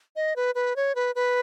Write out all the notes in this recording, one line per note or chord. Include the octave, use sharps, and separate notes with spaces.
D#5
B4
B4
C#5
B4
B4